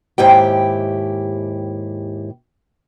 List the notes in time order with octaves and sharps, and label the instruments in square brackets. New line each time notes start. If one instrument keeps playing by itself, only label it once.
[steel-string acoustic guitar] D#2 G#2 E4 G4 G5